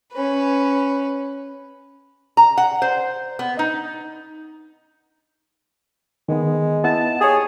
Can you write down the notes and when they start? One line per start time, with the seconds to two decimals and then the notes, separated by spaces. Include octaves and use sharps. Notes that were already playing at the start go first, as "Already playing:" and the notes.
0.13 C#4 B4
2.37 A#5
2.58 F#5
2.82 C5
3.39 B3
3.59 D#4
6.29 D#3 G#3 B3
6.84 B3 E4 F#5 A5
7.21 G4 G#4 C#5 D#6